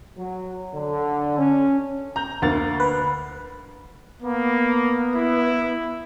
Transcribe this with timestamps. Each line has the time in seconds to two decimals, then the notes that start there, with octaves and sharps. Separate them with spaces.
0.18 F#3
0.74 D3
1.38 C#4
2.16 A#5 G6
2.42 D2 A#3 A6
2.80 B4
4.22 A#3 B3
5.15 E4